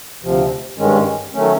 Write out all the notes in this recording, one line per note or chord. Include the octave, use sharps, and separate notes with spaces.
D2 C3 F3
G2 D#3 G#3 C#4
D#3 F#3 A3 C#4